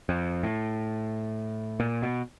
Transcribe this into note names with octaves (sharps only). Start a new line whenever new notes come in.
F2
A2
A#2
B2